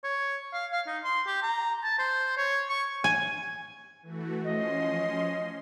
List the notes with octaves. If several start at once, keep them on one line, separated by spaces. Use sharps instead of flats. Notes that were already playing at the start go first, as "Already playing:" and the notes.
C#5
F5
F5
D#4
C6
G4
A#5
A5
C5
C#5
C#6
G#5
E3 A3 F#4
F3 C#4 D#5 C6